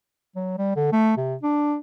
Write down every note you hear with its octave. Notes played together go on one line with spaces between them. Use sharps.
F#3
G3
D3
A3
C3
D4